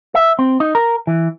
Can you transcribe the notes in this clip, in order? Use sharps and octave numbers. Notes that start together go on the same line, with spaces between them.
E5
C4
D#4
A#4
E3